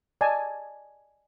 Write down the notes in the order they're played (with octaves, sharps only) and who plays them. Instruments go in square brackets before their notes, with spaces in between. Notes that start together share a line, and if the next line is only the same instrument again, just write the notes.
[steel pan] D5 D#5 G#5 A5